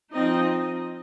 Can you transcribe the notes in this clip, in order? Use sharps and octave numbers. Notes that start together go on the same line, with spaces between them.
F3 C4 D#4 D#5